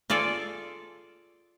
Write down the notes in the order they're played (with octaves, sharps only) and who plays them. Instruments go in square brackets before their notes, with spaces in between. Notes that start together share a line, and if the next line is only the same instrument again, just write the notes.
[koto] F4 G#4 A4 D5